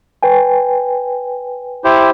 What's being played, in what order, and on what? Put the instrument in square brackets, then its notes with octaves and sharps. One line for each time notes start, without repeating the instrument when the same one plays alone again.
[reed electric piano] B4 G5 G#5
[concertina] E4 G4 C5